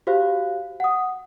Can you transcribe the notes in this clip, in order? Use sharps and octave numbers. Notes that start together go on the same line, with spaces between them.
F#4 G4 C5 F5 F#6
F#5 D#6